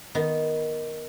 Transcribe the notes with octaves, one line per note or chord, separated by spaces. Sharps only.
D#3 B3